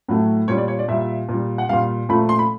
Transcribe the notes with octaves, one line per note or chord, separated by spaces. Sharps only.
A2 F#3 A3
A#2 G3 C#5
D5
C#5
D5
A#2 G3 E5
A#2
G3
F#5
A#2 G3 F5
A#2 F3 A3 B5
C6
B5